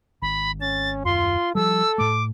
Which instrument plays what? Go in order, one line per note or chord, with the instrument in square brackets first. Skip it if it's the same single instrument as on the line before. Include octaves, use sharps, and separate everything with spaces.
[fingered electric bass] G#1 [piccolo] B5
[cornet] C#4 [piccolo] A6
[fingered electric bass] D#1 F#2 [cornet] F4 [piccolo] C6
[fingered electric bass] F3 G3 [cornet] A4 [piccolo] E6
[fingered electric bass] A2 A3 [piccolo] D6